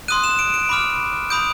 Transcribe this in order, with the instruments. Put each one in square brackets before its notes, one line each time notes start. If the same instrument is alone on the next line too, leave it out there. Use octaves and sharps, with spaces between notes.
[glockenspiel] C6 D#6 F#6 D#7
E7
D7
D7
B5 D6 F6
B5 D#6 G6 D7